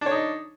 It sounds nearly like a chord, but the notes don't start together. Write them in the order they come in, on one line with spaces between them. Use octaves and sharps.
D4 C#5 D#4